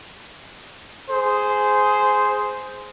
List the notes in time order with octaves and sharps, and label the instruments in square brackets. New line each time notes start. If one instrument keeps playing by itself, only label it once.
[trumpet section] G#4 C5